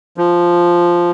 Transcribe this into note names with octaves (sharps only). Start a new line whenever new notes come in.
F3